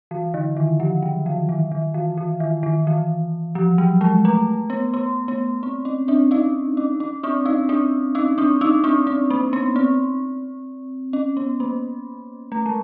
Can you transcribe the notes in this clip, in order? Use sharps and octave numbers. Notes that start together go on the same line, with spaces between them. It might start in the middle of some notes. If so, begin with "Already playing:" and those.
E3
D3
D#3
F3
F#3
E3
D#3
D#3
E3
E3
D#3
D#3
E3
F3
F#3
G#3
A3
B3
B3
B3
C4
C#4
C4 D4
C#4 D#4
C#4
C#4
C4 D4
C#4 D#4
C4 D4
C#4 D#4
C4 D4
C#4 D#4
C4 D4
C4
A#3
B3
C4
C#4
B3
A#3
A3
G#3